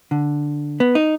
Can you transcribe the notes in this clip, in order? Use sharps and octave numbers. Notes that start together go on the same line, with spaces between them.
D3
B3
D#4